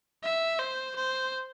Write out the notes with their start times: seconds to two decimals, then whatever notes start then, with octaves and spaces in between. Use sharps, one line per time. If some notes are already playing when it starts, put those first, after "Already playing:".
0.24 E5
0.59 C5
0.96 C5